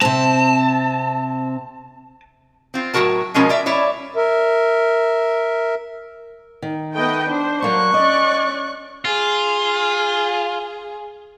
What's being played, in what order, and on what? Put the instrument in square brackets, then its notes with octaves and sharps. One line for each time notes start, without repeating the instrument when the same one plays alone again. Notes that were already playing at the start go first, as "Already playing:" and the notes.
[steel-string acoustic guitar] C3 C4 [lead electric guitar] A5
[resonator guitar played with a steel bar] C4 F4
A2 F#3 F#4 A#4 A5
B2 F3 G#3 C#4 A#4
A#4 D5 E5
E4 C#5 D5 E5
[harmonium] A#4 E5
[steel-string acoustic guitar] D#3
[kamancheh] A3 B4 [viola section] B3 D#5 G5
[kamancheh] D4 [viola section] C5
[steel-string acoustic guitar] F#3 A#3 D4 [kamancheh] C#6 F#6
[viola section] C#4 D5 [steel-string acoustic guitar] D#5
[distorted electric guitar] F4 [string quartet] G#4